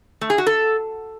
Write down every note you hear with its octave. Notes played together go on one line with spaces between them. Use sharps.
A3
G#4
F#4
A4